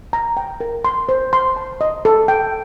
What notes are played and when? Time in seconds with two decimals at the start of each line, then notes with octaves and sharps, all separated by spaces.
0.13 A#5
0.37 G5
0.60 A#4
0.85 C6
1.09 C5
1.33 C6
1.56 A5
1.81 D#5
2.05 A4
2.28 G5